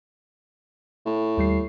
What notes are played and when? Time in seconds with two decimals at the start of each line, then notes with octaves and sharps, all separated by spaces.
1.05 A2
1.38 D#2 G3 C7